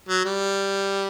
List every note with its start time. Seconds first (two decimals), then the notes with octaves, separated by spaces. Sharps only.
0.09 F#3
0.25 G3